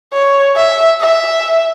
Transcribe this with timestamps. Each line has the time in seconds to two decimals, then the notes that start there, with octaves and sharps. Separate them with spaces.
0.13 C#5
0.56 E5
1.01 E5